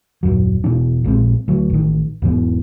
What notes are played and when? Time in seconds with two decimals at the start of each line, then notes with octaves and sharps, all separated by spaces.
0.23 D#1 A#1 F#2 F#3
0.64 E1 B2 E3 D4
1.04 A#1 A#2 G#3 C4
1.48 D2 F#3
1.70 A1 D#3
2.22 E1 G#2 E3 B3